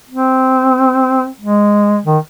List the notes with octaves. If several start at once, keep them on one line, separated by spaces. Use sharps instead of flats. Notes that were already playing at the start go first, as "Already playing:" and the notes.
C4
G#3
D#3